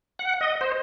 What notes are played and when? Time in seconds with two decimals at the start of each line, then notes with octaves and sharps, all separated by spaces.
0.19 F#5
0.41 D#5
0.61 C5